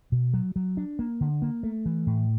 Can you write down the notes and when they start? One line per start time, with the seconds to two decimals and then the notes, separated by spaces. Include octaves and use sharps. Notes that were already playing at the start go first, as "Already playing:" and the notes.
0.12 B2
0.34 F#3
0.56 F#3
0.77 D4
0.99 A#3
1.21 D3
1.42 A#3
1.63 A3
1.86 E3
2.07 A2